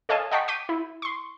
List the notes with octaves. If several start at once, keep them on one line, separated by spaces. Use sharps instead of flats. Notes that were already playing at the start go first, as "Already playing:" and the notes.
A4 C#5 D#5 F5 G#5 A5
D#5 F#5 G5 A5 C#6 B6
D6 G6 B6 D#7
E4
C6 C#6